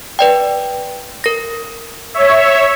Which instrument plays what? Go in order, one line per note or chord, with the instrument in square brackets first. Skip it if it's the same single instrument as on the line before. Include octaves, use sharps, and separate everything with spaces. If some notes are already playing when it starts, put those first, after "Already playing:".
[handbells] B4 D5 G5
A#4 A#6
[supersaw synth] C#5 E5